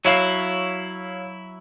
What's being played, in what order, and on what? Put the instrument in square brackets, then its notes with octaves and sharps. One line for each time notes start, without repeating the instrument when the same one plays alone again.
[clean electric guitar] F#3 E4 [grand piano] C#5 F5 C7